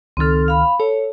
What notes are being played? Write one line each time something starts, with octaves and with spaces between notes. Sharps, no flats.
C#2 D#3 C4 A4 F6
F5 B5
A4 C#5